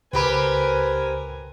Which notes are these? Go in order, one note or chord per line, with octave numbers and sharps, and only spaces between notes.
C#2 C4 G4 A#4 B4 G#5 B5